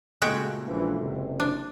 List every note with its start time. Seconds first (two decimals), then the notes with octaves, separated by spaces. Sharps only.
0.22 C#2 A#2 G#3 A3 F#4 G5
0.67 A#1 E3
0.98 F#1 C3
1.40 D4 C5